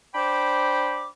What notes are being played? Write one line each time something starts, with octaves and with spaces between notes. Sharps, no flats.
D4 C5 G5 B5 D6